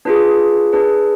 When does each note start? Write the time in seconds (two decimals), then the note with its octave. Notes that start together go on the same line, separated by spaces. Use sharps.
0.05 D4 F4 G#4 B4
0.73 D4 G#4 B4